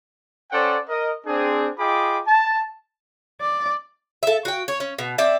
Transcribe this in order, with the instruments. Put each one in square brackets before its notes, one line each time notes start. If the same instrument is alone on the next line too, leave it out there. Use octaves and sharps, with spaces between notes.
[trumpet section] C#4 A4 C5 D5 F#5 G5
A#4 D#5
C4 D4 G#4
F4 G#4 D#5 G5 B5 D6
A5
[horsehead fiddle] D5
[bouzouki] A4 E5
F#4 G5
C#5
C#4
B2
C4 D5 E5